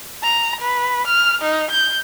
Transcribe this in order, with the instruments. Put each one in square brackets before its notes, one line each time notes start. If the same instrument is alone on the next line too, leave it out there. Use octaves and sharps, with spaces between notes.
[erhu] A#5
B4
F6
D#4
G6